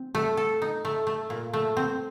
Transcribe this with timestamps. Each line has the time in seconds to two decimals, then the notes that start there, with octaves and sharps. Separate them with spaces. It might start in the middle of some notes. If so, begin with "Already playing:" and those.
Already playing: C4
0.15 A3
0.37 A4
0.62 D#4
0.85 A3
1.07 A3
1.30 A#2
1.53 A3
1.77 C4